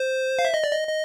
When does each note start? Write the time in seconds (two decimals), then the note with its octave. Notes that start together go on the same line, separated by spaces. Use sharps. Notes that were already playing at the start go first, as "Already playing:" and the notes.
Already playing: C5
0.39 F5
0.45 E5
0.54 D#5
0.64 D5
0.73 D#5
0.87 D#5